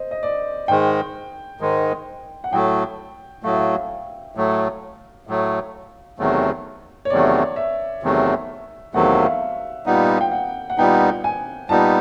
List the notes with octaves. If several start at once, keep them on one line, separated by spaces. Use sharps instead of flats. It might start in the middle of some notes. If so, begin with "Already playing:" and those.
Already playing: C5 D#5
D#5
D5
G#2 D#3 G#3 G5
G#2 D#3 G#3
F#5
A2 F#3 A3 G5
A2 F#3 A3 F5
E5
F5
A2 F#3 A3
A2 F#3 A3
E2 C3 D#3 F#3 A3
C#5
E2 C3 D#3 F#3 A3 D5
E5
E2 C3 D#3 F#3 A3
E2 C3 D#3 F#3 A3 F#5
F5
E5
F5
A#2 G3 B3 D#4 F#5
F5
F#5
G5
F#5
F#5
A#2 G3 B3 D#4 G5
G#5
A#2 G3 B3 D#4 A5